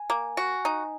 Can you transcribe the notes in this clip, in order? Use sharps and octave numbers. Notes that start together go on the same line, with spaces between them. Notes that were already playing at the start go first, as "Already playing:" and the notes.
Already playing: G#5
A#3
F#4
D#4